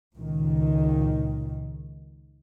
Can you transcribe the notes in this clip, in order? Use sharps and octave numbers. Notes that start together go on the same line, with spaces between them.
C#2 A#2 D#3